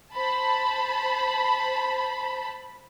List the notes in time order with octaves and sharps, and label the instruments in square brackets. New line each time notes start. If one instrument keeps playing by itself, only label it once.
[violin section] C5 A5 B5